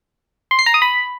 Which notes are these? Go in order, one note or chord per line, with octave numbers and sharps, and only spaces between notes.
C6
C7
A#5
D#6
B5